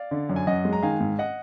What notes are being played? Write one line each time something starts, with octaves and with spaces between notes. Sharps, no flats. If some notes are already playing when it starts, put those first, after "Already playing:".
Already playing: D5 F5
D3
F#2
G#5
F#2 D#5 F#5
G#3
A#5
D#3 F5 G#5
G#2
D#5 F#5